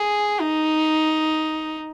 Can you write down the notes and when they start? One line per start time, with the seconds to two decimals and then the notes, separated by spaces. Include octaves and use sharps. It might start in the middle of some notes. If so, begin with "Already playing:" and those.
Already playing: G#4
0.41 D#4